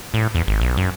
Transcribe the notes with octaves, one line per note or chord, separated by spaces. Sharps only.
A2
E2
G#1
B1
F#2